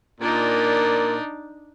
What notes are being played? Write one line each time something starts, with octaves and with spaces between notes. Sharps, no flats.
A#2 D4 D#4